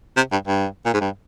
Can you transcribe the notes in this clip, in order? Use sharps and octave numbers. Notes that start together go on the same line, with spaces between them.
C3
G2
G2
A#2
G#2
G2